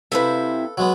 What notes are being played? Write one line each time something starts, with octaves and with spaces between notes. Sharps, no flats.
C3 C4 E4 A4 B4 F5
F#3 G#3 B3